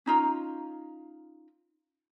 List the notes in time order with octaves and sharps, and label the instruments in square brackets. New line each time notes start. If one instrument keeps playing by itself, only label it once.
[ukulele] C#4 D#4 F4 A#5